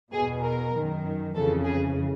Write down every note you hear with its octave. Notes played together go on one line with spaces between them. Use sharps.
E2 B2 G#4
A#4
F#2 D#3
F2 C#3 E3 A4
G#4